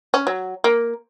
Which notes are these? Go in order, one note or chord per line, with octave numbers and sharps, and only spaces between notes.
C#4
F#3
A#3